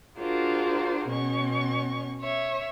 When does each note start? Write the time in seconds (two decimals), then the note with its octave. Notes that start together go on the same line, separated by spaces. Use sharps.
0.19 D4 F4 F#4 G#4 A#4 C5
1.08 B2 C#4 C#6
2.22 C#5 E5